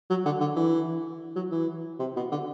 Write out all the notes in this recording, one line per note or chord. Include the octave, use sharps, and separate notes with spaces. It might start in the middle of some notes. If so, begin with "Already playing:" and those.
F#3
D3
D3
E3
F#3
E3
C3
B2
D3